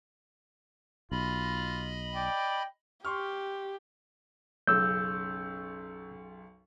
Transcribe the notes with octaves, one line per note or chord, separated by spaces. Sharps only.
B1 F4 D#5 B5
D5 G5
G4 C6 C#6 F6
B1 F#2 C#3 E6 G6